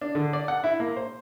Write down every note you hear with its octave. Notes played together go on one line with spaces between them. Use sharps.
D4
D3
D5
F#5
E4
A#3
C5